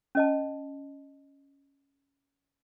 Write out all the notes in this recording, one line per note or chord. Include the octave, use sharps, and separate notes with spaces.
C#4 D#5 A5